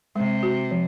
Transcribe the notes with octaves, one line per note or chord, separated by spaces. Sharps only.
C3 G#3
F#4
F3